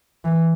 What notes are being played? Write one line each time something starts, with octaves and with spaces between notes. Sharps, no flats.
E3